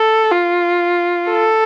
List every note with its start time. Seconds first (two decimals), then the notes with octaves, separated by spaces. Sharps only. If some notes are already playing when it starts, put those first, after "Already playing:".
Already playing: A4
0.31 F4
1.30 A4